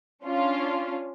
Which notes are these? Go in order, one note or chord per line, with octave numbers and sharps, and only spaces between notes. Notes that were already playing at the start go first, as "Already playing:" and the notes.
C#4 D4 F4